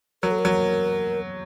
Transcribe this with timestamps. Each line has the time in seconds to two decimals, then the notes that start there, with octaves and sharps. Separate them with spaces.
0.23 F#3 A#4
0.31 A4
0.39 A#4
0.45 F#3